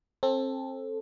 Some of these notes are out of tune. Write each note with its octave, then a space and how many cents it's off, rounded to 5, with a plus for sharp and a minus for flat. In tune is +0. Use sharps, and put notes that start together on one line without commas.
C4 +25 A4 +0